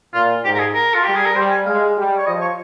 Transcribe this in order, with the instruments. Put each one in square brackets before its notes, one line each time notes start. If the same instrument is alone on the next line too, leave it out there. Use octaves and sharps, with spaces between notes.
[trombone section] A#2 [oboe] F4
[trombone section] G#2 [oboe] G4
[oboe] A#4
G#4
A#4
F4
[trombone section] G3 [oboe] G4
[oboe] G#4
A#4
[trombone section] G3 [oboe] C5
[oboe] G#5
[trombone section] G#3 [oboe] F5
[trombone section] G3
[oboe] C#5
[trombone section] F3 [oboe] D#5
[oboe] C#5